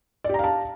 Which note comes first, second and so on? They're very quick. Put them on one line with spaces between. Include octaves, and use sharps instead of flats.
D5 G4 A#5 F5 A5